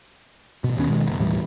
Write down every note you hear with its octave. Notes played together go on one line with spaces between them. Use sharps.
A1 B2
D#2 D#3 B3 C#4
B2 D#3 G#3
F#1
D#2 A2 E3 G3